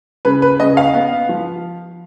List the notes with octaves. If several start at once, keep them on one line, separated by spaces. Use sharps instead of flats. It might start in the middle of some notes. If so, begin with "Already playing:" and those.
C#3 B4
B4
C#3 D#5
F5
B3
F3